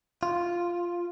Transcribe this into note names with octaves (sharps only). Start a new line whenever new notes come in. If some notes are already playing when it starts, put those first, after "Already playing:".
F4